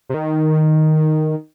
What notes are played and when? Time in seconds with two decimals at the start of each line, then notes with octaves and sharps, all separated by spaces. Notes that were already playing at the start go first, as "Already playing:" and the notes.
0.09 C3
0.14 D#3